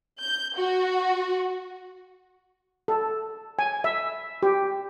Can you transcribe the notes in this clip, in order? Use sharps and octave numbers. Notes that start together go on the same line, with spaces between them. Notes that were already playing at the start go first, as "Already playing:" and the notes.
G6
F#4
A4
G#5
E5
G4